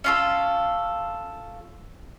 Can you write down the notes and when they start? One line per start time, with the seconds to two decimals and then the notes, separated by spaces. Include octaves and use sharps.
0.04 C#4 F4 A4